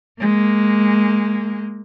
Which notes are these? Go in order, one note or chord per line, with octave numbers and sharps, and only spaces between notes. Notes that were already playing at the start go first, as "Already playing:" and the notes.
G#3 A#3